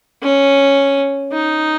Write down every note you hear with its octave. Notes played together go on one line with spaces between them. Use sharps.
C#4
D#4